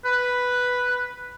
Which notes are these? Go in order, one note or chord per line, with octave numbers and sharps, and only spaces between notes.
B4